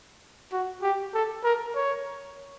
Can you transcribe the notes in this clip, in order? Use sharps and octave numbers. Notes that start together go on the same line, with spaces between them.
F#4
G4
A4
A#4
C#5